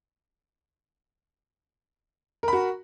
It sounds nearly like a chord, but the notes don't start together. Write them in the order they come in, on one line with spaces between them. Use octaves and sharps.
A#4 B5 F#4